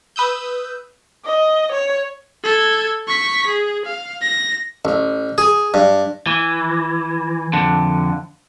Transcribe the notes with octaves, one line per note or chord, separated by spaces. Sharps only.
B4 D#6 E6 G6
D#5
C#5
A4 G#6
C#6 B6
G#4
F5
A#6
A1
G#4
G2
E3
F2 D3